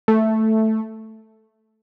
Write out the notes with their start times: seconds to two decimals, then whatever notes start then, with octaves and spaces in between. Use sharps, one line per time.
0.08 A3